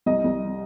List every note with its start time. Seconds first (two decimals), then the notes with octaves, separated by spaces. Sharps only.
0.06 C2 D#5
0.24 C2